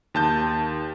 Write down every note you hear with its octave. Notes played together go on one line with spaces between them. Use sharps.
D#2 A5 G6